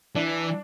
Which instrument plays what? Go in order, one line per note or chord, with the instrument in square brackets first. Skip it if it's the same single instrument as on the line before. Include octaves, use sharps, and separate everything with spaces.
[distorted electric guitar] E3 [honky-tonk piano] D4